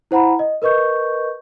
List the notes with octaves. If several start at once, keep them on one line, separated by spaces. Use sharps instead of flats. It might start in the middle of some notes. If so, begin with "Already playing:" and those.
E4 C5 F#5 A#5 B5
D#5
A#4 B4 D#5 C#6 G6